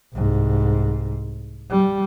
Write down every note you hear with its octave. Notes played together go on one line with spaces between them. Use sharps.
C2 G#2
G3